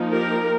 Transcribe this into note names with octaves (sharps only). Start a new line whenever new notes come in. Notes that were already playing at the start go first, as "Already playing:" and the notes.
Already playing: F3 A#3 D#4
G4 A#4